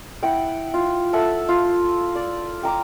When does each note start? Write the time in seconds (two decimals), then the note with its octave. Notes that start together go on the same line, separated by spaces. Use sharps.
0.23 E4 F#5 G5
0.74 F4
1.13 A4 E5 F#5 A5
1.49 F4
2.16 D5
2.63 G5 A#5 D6